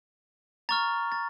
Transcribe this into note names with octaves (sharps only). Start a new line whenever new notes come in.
A#5 C#6 F6 A6
A6